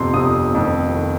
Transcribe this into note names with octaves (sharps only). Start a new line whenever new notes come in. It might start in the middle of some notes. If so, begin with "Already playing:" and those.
Already playing: G1 F2 C3 C6
G1 F2 C3 D#6
F1 F2 D#3
D#3